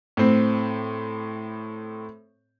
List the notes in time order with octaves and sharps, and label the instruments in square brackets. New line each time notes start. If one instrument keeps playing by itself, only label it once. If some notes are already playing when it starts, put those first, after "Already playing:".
[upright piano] A2 C4